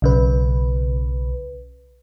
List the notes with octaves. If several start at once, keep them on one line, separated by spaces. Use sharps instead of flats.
B1 C#3 B4